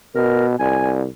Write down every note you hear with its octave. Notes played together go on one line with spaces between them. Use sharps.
B2 A#4
C2 G#5